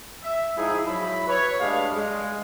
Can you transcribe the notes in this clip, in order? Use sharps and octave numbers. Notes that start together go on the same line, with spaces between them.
E5
G#2 F3 D#4 E4 G#4
F#3 E4 B5
B4 C#5
G2 G#3 A3 D4 F5
G#3